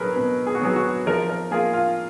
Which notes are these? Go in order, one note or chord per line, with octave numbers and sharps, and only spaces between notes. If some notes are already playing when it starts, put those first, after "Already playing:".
Already playing: B2 F#3 B3 G#4 A#4 B4
B2 B4
G#4
F#4
F#3 B3 G#4
F#4
F3 A#4
A#4
A#3 F4 G#4
F4